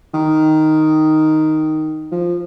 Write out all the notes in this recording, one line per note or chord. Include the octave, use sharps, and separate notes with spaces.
D#3
F3